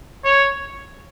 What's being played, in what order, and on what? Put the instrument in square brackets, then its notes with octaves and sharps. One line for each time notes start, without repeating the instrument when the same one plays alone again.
[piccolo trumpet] C#5